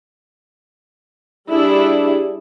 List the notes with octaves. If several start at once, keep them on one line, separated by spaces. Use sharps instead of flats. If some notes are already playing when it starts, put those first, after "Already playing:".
G3 D4 E4 G#4